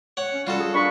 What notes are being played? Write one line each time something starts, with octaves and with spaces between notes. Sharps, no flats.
C#5 F#5
C#4
G3 F4 F#4 A4
G#4
A#2 D4 B5 C#6